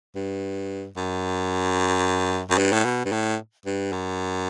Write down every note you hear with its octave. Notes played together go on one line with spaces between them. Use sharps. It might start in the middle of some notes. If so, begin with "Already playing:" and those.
G2
F#2
F#2
G2
A2
B2
G2
A2
G2
F#2